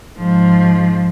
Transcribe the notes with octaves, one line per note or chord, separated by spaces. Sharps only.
G#2 F3